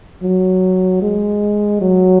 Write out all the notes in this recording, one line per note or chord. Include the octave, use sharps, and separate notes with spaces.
F#3
G#3
F#3